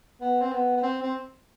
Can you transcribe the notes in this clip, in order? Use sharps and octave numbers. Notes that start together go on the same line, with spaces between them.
B3
C4
B3
B3
C4
C4